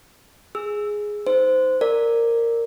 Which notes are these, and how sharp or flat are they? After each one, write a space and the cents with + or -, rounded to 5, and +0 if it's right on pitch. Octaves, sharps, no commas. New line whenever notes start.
G#4 +0 E6 +0
D#4 +10 C5 -15
A#4 -10 D5 +0